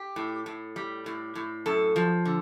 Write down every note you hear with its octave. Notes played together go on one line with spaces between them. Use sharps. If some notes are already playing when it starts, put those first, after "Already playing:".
Already playing: G4
A2
A2
G3
A2
A2
F#2 A4
F3
D3